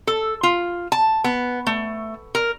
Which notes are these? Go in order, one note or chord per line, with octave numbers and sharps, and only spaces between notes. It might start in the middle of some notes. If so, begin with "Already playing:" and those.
A4
F4
A5
B3
A3
A#4